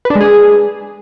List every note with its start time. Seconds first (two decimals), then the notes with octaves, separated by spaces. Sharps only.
0.05 B4
0.10 D4
0.15 G#3
0.21 G#4